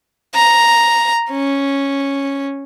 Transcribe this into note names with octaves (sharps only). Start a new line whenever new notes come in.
A#5
C#4